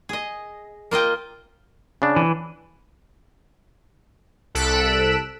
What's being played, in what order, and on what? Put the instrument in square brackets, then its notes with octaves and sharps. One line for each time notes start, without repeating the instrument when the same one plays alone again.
[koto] G#4 D#5
A#3 F4 D#5 G5
[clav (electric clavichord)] C#3 D4
[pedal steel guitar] E3
[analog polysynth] C2 A4 F#6 B6 D7 E7